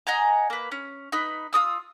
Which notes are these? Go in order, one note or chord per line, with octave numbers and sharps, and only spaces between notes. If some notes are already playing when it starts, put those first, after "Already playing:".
D#5 F#5 G#5 A#5
A#3 B4
C#4
D#4 B4
F4 F#4 D#6 E6